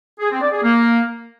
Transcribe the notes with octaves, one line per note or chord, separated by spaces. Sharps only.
G#4
C4
D5
G#4
A#3